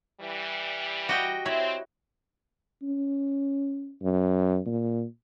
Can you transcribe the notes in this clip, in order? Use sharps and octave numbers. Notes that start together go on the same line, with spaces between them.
E3 G3
F#4 G4 D#5 G5 A#5
C4 E4 C#5 B5
C#4
F#2
A#2